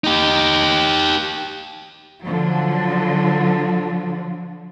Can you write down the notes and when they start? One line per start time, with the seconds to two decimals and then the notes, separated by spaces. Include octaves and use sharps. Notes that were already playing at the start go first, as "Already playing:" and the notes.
0.04 D#4 G4
2.22 D3 F3 F#3